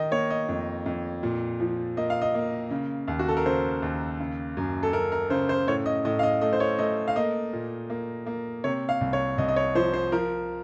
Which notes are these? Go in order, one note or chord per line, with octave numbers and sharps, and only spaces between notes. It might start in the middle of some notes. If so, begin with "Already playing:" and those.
Already playing: D#3 D#5
A#3 C#5
D#5
F2
F2
A#2
F3
A#3 D#5
F5
D#5
A#3
C#3
D#2
F#4
A4
A#4
C#3 C5
D#2
C#3
F#2
A4
F#2 A#4
A#4
C#3 C5
C5
A2 C#5
D#5
A2 D#5
F5
D#5
A3 D#5
C5
C#5
A3 D#5
F5
A#3 D#5
A#2
A#3
A#3
C3 C#5
F5
C2
C#5
C2 D#5
D#5
C#5
F3 C5
C5
F3 A#4